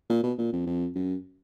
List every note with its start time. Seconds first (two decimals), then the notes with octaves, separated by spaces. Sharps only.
0.10 A#2
0.23 B2
0.38 A#2
0.52 F2
0.66 F2
0.95 F#2